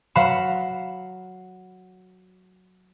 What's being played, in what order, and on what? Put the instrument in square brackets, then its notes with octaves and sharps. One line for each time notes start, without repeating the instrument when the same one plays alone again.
[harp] F#3 F5 F#5 B5 E7